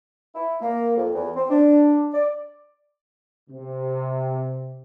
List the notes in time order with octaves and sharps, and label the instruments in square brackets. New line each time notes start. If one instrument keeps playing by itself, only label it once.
[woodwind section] E4
A#3
F2
E2
C4
D4
D5
[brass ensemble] C3